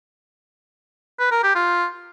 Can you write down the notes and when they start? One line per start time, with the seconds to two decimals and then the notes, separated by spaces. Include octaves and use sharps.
1.19 B4
1.31 A#4
1.43 G4
1.55 F4